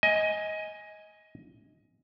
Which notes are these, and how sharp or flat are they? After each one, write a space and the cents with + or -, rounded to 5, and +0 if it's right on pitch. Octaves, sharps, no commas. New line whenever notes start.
D#5 +15 G#5 +0